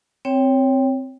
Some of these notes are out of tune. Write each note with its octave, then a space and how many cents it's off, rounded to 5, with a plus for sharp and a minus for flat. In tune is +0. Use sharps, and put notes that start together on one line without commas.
C4 +0 C#5 +0 G5 +5